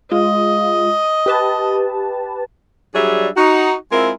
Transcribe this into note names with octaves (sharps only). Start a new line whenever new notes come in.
G#3 F4 D#5
G4 B4 A5
F#3 G3 D4 G#4 E5
D#4 F#4
G#3 C4 E4 F4 A#4